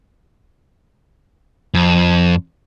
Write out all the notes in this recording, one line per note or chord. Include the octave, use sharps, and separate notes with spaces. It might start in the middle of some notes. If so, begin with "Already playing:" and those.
F2